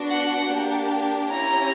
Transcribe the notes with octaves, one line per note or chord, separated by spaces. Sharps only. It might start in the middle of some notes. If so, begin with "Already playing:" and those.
Already playing: B3 D4 F#4
F#5
A#3 D4 G4
C#4 E4 G4 A#5